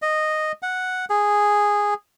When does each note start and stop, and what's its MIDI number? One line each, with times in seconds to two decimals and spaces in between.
0.02 0.52 75
0.63 1.05 78
1.10 1.94 68